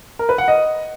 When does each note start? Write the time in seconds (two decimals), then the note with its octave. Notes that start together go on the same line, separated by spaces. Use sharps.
0.19 A#4
0.29 B4
0.38 F#5
0.48 D#5